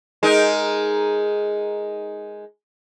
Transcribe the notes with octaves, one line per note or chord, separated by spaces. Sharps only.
G#3 D#4 A#4